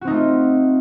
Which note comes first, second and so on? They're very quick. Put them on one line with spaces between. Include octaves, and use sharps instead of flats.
F#4 C4 D#4 A3 F4